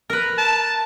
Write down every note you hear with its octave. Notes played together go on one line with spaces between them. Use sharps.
A#4 B4
A5